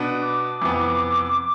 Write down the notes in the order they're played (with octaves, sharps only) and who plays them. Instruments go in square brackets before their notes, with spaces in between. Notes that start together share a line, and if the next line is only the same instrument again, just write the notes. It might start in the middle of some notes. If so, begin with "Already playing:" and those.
Already playing: [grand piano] B2 B3 D4
[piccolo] D6
[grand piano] F2 C3 E3 B3